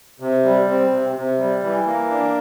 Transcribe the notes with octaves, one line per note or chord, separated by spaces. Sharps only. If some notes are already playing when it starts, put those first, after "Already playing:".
C3
G3
C4
C3
C3
G3
E3
A#3
D4